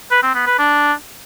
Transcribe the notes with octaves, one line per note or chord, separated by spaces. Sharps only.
B4
C4
B3
B4
D4